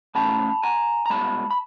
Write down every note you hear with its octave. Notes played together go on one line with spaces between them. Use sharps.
C#2 C#3 E3 A3 A5 B5
G#5 A#5
A#5
C2 B2 G#3 A5 B5
B5